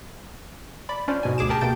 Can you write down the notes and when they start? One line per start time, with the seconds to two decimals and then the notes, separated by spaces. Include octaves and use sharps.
0.89 D5 B5
1.08 C#4 D4 F4 C5 D5
1.23 G#2 B2 G#5
1.38 D2 G#4 D6 E7
1.49 G4 G#4 A#4 G5 A5
1.61 B2 A#3 G5 G6 A6 D7